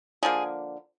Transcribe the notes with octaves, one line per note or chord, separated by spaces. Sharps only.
D3 F3 A#3 G#4